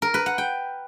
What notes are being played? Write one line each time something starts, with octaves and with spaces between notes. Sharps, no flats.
A#4
B4
F#5
G5